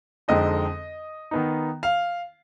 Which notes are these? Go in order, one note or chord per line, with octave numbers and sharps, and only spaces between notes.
F2 D3 G#3 C4 D#4 D#5
D#3 B3 D#4
F5